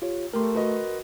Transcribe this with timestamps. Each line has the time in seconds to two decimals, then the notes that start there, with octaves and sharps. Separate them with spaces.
0.02 F4 G4 C#5
0.33 A3 G4 A#4 C6
0.54 F#4 B4 D#5